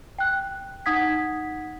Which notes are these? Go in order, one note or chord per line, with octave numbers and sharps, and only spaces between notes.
G5 F#6
D#4 F#5 D#6 G#6 B6